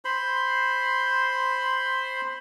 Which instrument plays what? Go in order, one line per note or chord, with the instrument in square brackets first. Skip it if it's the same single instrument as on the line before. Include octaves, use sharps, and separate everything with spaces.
[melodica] C5 B5 C6